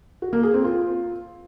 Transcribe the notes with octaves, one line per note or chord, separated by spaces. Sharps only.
F#4
A#3
G#4
C4
F4